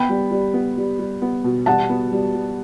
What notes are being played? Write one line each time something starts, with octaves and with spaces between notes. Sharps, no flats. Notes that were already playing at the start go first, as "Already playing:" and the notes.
Already playing: B3 G5 B5
G3
G3
B3
G3
G3
B3
B2
G3 F#5 A5
B3
G3
G3